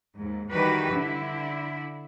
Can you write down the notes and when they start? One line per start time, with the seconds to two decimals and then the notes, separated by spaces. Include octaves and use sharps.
0.16 D#2 G#2
0.50 D#3 E3 G3 F#4 G4 B4
0.92 D3 E4